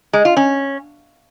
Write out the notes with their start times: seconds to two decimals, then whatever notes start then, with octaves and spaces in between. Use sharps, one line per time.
0.13 G#3
0.25 F4
0.37 C#4